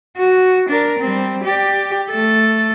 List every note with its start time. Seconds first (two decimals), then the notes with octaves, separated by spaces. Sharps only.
0.17 F#4
0.69 D4 A#4
0.99 G3 C4
1.44 G4 D5
2.10 A3 A4